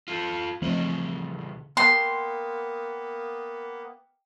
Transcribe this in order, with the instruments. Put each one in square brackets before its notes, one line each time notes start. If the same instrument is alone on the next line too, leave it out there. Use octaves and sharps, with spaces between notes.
[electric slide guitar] F4 A4
[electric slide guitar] E2 C#3 D#5 [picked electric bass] F3 A3 C4
[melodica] A#3 B3 [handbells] G5 [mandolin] C6